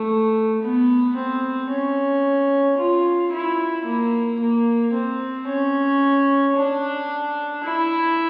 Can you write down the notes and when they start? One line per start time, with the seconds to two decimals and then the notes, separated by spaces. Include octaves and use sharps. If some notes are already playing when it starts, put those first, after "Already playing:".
Already playing: A3
0.62 B3
1.16 C4
1.70 C#4
2.78 F4
3.32 E4
3.85 A#3
4.39 A#3
4.93 C4
5.48 C#4
6.56 D4
7.64 E4